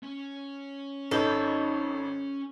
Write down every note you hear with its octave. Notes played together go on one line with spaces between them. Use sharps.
C#4
G#1 D#4 A4 C#5 G6